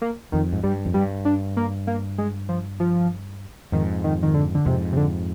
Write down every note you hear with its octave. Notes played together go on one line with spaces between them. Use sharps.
A#3
F2 D#3
G#2
G2 G3
F2
G2 G3
D4
A#3
A#3
G#3
F3
F3
F2 G#2 D#3
D#3
D#3
D3
D3
F2 G#2 C3
C3
D3